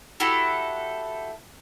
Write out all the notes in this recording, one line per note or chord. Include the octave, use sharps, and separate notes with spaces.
E4 F#4 G4 A4